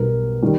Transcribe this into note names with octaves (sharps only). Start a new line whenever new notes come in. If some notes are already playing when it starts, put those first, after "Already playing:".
Already playing: B1 B2 G3 A#4
D#3 G3